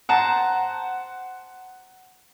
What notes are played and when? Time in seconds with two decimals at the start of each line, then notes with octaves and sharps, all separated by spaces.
0.09 C5 F#5 A5 A#5